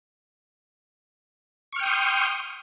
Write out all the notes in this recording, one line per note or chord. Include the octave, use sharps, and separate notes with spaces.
G5 C6 C#6 D#6 F6